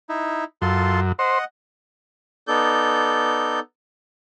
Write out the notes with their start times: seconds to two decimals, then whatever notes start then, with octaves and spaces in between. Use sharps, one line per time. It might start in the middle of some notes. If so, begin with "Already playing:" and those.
0.09 D#4 E4
0.62 F#2 F4 A4 C6
1.19 C5 D#5 F#5
2.47 B3 D#4 A4 D5 G6